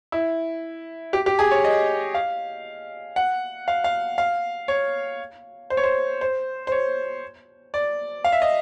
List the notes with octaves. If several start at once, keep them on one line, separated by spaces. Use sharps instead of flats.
E4
G4
G4
G#4
C#5
D#5
F5
F#5
F5
F5
F5
C#5
C5
C#5
C5
C5
C5
C#5
D5
F5
E5
D#5